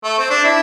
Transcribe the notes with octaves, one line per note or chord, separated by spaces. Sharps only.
A3
C4
D4
D4 E4